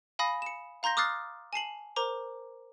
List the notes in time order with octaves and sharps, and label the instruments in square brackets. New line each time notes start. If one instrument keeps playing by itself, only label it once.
[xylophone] F5 G#5 B5 D#6 A#6
C#7 E7
F5 A#5 C6 G6 A#6
D6 D#6 F6 F#6 A6 C7
G#5 A5 C7 F#7
A#4 C5 A#5 D6